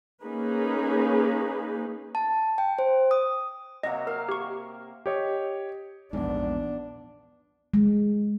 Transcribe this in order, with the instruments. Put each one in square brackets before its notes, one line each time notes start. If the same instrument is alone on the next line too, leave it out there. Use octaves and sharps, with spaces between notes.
[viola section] A#3 C#4 D#4 G#4 B4
[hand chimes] A5
G5
C5
D#6
[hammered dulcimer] C3 F#3 A#3 [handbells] D#5
[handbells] A#4 [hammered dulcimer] F5
[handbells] G4 C#6
[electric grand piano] G4 C#5 D#5
[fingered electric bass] A#1 E2 G#2 [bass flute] B3 [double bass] D4
[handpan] G#3